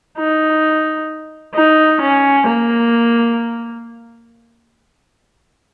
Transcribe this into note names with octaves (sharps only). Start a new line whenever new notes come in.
D#4
D#4
C#4
A#3